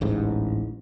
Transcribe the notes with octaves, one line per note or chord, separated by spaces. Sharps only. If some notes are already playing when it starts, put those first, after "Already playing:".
D1 A1 G#2